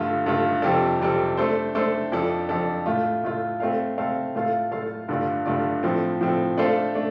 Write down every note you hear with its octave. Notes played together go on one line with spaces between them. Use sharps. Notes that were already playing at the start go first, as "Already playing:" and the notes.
Already playing: G2 D3 A3 F4
G2 D3 A3 F4
F2 C3 G3 C4 A4
F2 C3 G3 C4 A4
A3 D4 A4 C5
A3 D4 A4 C5
F2 F3 D4 A4
F2 F3 D4 A4
A2 A3 F4
A2 A3 F4
A3 C4 A4 F5
A3 C4 A4 F5
A2 A3 F4 A4 F5
A2 A3 F4 A4 F5
G2 D3 A3 F4 D5
G2 D3 A3 F4 D5
A2 F3 C4 A4
A2 F3 C4 A4
A3 D4 A4 C5 F5
A3 D4